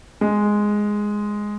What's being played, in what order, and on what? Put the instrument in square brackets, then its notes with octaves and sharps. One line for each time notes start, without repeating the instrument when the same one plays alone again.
[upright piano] G#3